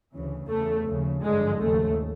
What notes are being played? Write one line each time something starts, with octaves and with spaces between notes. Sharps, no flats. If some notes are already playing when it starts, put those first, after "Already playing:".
D2 C#3 E3
E2 C#3 E3 A3
D#2 C#3 F3
G#1 G2 D3 F3 G#3
D#2 C#3 F3 A3